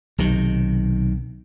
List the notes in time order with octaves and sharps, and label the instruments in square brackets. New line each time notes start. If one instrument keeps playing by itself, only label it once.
[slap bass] B1 C3 D#3